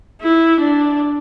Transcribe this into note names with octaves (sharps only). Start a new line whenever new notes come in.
E4
D4